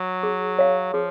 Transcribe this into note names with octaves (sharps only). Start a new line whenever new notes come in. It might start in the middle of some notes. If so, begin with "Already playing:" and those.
Already playing: F#3
G#4
C#5 F5
F3 G#4